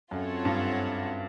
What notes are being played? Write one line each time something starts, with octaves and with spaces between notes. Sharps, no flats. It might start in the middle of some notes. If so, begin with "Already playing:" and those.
F#2 C4 F4 A4 C#5 F#5
G2